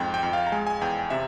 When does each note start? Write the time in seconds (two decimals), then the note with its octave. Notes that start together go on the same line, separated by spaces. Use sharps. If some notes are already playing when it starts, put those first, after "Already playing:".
Already playing: F2 G#2 G5
0.14 G5
0.23 F2
0.33 F5
0.47 A#5
0.52 G#3 G#5
0.67 G#5
0.81 E2 G5
1.10 C3 E5